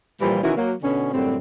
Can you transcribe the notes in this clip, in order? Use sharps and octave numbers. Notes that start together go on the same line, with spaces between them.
A#2 E3 F3 G3
B2 D#3 E3 C#4 E4 F#4
F#3 A#3
B2 D3 C#4
F#2 A2 D3 G3 C4